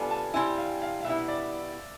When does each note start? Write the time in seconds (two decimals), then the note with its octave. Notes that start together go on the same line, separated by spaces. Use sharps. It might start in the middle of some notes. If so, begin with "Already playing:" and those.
Already playing: G3 B3 D4 F4 A4 G#5 A5
0.11 A5
0.34 G3 C4 E4 G#5
0.58 F5
0.82 F5
1.01 F5
1.04 B2 G3 B3 E4 E5
1.28 D5